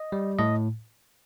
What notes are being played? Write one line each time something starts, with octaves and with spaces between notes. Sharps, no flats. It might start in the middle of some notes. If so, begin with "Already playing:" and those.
Already playing: D#5
G3
A2 D#5